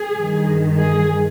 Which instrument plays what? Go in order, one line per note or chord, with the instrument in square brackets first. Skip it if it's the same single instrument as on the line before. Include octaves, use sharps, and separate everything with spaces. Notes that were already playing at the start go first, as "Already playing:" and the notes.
Already playing: [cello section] G#4
G2 D#3
G#4